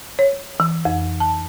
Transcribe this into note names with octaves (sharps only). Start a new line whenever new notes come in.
C#5
E3
F2
A5